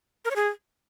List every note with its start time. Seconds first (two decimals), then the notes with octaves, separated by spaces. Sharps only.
0.25 A#4
0.30 C#5
0.36 G#4